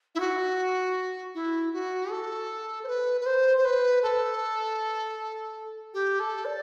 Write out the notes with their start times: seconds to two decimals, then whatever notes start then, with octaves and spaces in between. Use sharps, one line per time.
0.15 E4
0.20 F#4
1.35 E4
1.73 F#4
2.11 A4
2.84 C5
2.88 B4
3.21 B4
3.26 C5
3.57 C5
3.65 B4
4.03 A4
5.94 G4
6.20 A4
6.45 D5